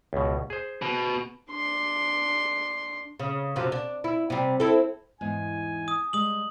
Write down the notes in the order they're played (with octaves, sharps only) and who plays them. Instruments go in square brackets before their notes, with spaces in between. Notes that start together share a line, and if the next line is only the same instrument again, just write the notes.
[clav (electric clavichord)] C#2 B2
G#4 C5
[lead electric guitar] B2
[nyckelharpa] D4 C6
[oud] C#3
F#2 C3 F3
D4
E4
C3 G3
C4 E4 A4
[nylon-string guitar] E2 G#2 [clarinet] G#5
[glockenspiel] D#6
[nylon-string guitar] G3 G#3 [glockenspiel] D#6 F#7